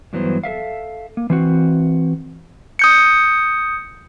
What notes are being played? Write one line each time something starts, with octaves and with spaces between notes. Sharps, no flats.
G2 E3 F#3 B3 C5
A4 A#4 E5 F5
A#3
E3 C4 F#4
D#6 G6 C#7